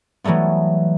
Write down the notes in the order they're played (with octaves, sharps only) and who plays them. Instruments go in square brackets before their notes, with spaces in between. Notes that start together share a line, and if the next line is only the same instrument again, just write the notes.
[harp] E3 F#3 G3 A3 B3